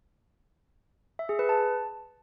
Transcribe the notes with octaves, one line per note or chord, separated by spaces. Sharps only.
E5
G#4
B4
A5